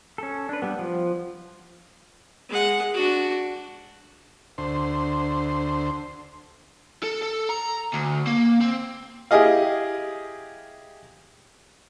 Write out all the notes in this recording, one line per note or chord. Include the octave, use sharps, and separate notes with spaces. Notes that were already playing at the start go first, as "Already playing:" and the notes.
C#4 A4
D4 B4
G3 B3
F3
G#3 F#5
D4 F#4
D2 C5
A4
A4
A#5
D2
A#3
C4
E4 G4 G#4 D#5 F5